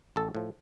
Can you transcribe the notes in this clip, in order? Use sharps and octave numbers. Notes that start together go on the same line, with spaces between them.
A1 A4
A2 F3